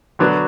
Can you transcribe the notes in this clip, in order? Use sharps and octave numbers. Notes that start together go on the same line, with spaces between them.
D3 F#3 B3 D4 F#4